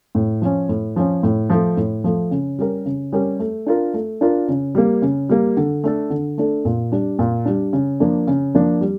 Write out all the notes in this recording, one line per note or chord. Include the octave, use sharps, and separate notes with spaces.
A2
F3 C#4
A2
F3 C#4
A2
F3 A3
A2
F3 A3
C#3
G3 C#4 G4 A#4
C#3
G3 C#4 G4 A#4
A3
D4 F4 A#4
A3
D4 F4 A#4
C#3
G3 A#3
C#3
G3 A#3
D3
A3 D4 A4
D3
A3 D4 A4
A#2
G3 D4
A#2
G3 D4
C#3
F3 A#3 D4
C#3
F3 A#3 D4
G3